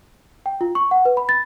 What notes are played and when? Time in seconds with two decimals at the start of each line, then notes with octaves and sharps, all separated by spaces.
0.46 G5
0.61 F4
0.75 C#6
0.91 F#5
1.05 B4
1.17 B5
1.29 A6